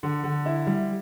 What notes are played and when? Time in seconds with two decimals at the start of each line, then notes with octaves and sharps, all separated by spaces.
0.03 D3
0.24 D3
0.46 E4
0.67 G3